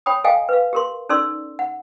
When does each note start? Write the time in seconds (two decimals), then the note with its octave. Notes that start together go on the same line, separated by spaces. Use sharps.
0.06 C#5 G5 B5 D#6
0.24 A4 D#5 F5 G5 G#5
0.49 B4 F5
0.73 G4 A#4 C6
1.09 C#4 D#4 A4 D5 C6 E6
1.59 F#5